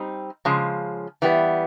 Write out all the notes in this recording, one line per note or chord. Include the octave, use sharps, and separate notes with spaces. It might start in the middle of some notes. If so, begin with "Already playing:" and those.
Already playing: G3 C4 D#4
C#3 F3 G#3
E3 G3 B3